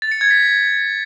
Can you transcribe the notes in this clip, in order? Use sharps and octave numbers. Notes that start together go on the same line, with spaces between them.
A6
C#7
G#6
B6